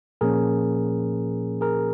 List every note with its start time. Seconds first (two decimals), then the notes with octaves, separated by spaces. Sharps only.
0.21 A#2 F3 A#3 C#4 G#4 A#4
1.61 G#4 A#4